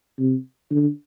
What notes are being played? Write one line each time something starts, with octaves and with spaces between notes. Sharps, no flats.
C3
D3